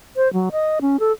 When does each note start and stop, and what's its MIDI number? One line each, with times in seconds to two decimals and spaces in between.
0.16 0.31 72
0.33 0.49 54
0.52 0.79 75
0.81 0.99 61
1.00 1.12 69